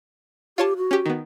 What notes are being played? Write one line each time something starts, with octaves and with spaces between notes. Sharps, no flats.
F4 G4 C#5 A5
F#4
C#4 G4
D#3 B3